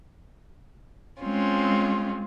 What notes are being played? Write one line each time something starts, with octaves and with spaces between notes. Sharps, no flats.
G#3 C4 C#4 F4